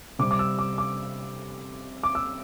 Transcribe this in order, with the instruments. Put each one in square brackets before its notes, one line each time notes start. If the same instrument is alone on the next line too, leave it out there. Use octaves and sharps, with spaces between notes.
[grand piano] C3 G3 C4 D6
D6
E6
D6
D6
D6
E6